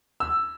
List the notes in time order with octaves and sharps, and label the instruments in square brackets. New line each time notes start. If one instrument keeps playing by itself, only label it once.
[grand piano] E6